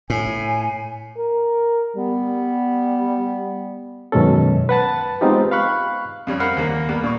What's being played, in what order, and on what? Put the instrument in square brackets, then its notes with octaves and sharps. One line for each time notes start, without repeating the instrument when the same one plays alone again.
[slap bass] A2 [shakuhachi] G#5
[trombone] A#4
[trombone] G3 [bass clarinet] B3
[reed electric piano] F#2 B2 D#3 G#3 C#4 A4
B4 F#5 A5 A6
G#3 B3 C4 D#4 F4 G4
F5 B5 C#6 F#6
[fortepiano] F2 G3 C#4
A#4 C5 F5 F#5 B5
D#2 A#3
G3 A#3 B3
A#2 C#6